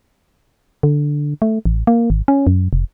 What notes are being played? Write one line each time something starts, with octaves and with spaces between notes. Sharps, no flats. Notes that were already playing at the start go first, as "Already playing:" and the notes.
D3
A3
A1
A#3
G#1
C#4
F#2
F1